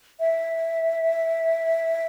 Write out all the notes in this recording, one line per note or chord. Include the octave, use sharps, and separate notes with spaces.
E5